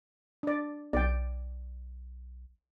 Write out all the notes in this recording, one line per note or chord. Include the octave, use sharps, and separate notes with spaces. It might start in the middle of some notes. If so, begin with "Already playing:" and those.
D4 D5
B1 D5 G5